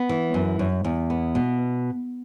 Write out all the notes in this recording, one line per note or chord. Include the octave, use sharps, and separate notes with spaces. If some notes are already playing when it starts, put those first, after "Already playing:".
Already playing: B3
E3
F#2
F#2
E2
B3
B2